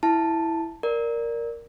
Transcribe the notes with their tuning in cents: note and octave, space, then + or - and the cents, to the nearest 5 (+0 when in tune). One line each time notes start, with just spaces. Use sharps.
E4 +0 A5 +0
A#4 +0 D5 +0